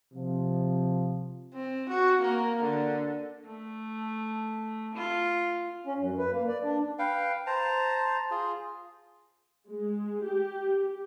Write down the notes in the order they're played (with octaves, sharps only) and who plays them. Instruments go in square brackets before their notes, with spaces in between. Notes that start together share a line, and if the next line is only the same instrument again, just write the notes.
[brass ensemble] C3 F3
[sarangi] C4
F#4
A#3
D3
[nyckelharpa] A3
F4
[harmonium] C#4
F#2
B4
A#3
D5
D4
[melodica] B4 F5 G5
C5 A5 A#5
F4 G#4
[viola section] G#3
G4